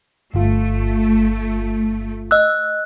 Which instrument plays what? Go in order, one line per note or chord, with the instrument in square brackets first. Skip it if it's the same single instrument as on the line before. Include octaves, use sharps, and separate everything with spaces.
[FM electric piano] G1 F4 [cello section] A3
[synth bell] D#5 E6 [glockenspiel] F#6